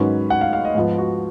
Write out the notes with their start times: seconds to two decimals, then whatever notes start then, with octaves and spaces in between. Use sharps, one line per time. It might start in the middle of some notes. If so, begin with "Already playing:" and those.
Already playing: G#2 D#3 F#3 C#4 B4
0.30 F#5
0.41 F5
0.53 F5
0.65 D#5
0.75 G#2 F3 B3
0.98 F#4